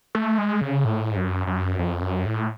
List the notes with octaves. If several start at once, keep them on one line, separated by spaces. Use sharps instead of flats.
A3
G#3
C#3
A2
G#2
F#2
F#2
F2
F#2
A2